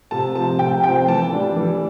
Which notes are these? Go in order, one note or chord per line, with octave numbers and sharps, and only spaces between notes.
C3 A5
F3 C4 A5
C3 G5
F3 C4 G5
E3 A5
G3 D4
E3